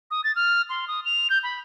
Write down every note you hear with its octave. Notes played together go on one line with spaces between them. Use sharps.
D#6
A6
F6
C6
D#6
F7
G6
B5